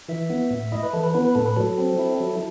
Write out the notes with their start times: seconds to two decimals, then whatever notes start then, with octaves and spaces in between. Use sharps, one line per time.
0.08 E3 E5
0.30 B3
0.51 A2
0.72 E4 D#5
0.83 B4
0.93 E3 A4
1.03 B4
1.14 B3 B4
1.25 B4
1.35 A2 A4
1.46 B4
1.56 F#3 A4
1.78 C4
1.99 E4
2.20 F#3